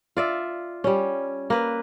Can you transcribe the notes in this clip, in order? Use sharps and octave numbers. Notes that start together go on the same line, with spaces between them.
F4 D5 E5
G3 C#4
A#3 B4